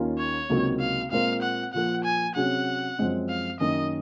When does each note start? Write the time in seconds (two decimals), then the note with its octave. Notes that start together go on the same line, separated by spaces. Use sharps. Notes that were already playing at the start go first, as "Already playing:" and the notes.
Already playing: D#2 D#3 A#3 C#4 F4
0.18 C#5
0.50 C#2 C3 F#3 A#3 D#4
0.80 F5
1.11 A#2 G#3 C4 F4 A#4 F5
1.42 F#5
1.73 A#2 F3 A#3 F#5
2.05 G#5
2.35 C3 F#3 C#4 G#4 F#5
2.98 F#2 F3 G#3 C4
3.29 F5
3.60 F#2 D#3 A#3 C#4 D#5